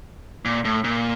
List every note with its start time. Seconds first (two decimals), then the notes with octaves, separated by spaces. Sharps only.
0.45 A#2
0.65 A2
0.84 A#2